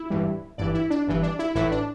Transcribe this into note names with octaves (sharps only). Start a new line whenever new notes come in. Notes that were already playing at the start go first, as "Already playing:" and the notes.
Already playing: E4
A1 G2 E3 G3
G1 G2 E3 D5
E4
D4
G1 G2 E3
D4
E4
A1 A2 E3 A3 E4
D4